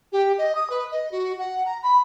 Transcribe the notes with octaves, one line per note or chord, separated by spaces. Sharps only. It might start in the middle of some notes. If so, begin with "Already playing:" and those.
G4
D#5
D#6
B4
D#5
F#4
F#5
A#5
B5